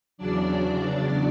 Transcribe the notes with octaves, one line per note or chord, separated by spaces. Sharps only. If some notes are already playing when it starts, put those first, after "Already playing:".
E2 C#3 F#3 D4 D5